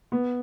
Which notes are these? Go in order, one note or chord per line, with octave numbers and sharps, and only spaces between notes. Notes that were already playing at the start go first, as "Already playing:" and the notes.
B3